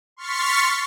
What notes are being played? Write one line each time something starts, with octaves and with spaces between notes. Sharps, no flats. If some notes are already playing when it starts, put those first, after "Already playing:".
C6 C#6 F6 A6 B6 C#7